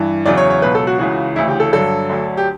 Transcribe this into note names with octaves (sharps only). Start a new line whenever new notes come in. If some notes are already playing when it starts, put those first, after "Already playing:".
Already playing: G2 E3
E2 C#3 F#3 D5
C#5
C#5
C#2 B2 F#3 B4
A4
F#4
C#2 C#3 E3 F#4
D2 C#3 E3 E4
G4
A4
G2 D3 F#3 A4
D2 D3 F#3
G4